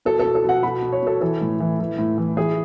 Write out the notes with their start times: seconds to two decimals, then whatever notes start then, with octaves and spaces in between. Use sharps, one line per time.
0.05 B2 A4
0.19 A4
0.25 B2
0.35 A4
0.44 B2 F#5
0.63 B2 B5
0.82 B2
0.92 C#5
1.02 B2 A4
1.21 E3 A4
1.41 A2
1.60 E3
1.80 E3
1.98 A2
2.18 E3
2.37 E3 G#4